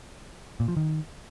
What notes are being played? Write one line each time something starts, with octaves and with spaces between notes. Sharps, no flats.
A#2
F3
D#3